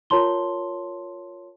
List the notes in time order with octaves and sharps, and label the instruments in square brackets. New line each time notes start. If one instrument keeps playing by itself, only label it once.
[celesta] F4 A#4 C#5 A5 C6 G7